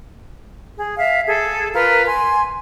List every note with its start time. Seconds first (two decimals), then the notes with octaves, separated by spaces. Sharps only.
0.79 G#4
0.97 E5 F5
1.27 G#4 A4
1.74 F4 A#4 B4
2.06 G#5 C6